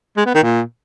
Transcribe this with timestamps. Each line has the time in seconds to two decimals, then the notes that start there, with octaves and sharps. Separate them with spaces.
0.17 G#3
0.26 B3
0.34 D#3
0.43 A#2